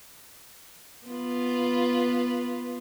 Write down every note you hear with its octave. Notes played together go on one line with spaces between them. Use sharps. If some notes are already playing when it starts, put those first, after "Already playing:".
B3 F4 B4